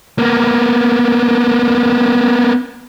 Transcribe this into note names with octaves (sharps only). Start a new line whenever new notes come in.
A#3 B3